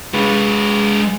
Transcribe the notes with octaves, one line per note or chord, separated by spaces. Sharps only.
G#3 B4